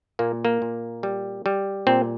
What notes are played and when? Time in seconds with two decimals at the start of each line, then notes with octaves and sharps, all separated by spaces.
0.19 A#2 A#3
0.45 A#3
0.62 A#2
1.03 G3
1.46 G3
1.87 A#2 C4